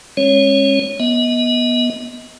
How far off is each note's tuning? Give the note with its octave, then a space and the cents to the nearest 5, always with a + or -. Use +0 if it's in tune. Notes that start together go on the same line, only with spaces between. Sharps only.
G#3 -20 C#4 -35 C#5 +0
B3 -25 D#5 +30